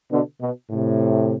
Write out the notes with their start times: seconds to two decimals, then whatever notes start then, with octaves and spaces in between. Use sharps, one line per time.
0.11 B2 D3
0.40 B2
0.70 A2 C3